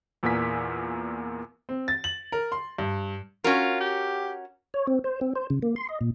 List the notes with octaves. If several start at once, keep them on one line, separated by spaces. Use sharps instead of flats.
E2 A#2 B3 A#4 G#5 B6
C4
A6
F#7
A#4
C6
G2
C#4 F4 F#4 A#4
G4
C#5
C4
C5
C4
C5
C#3
A#3
C6
D#5
A#2